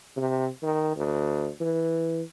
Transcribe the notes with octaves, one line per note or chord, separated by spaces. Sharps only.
C3
D#3
D2
E3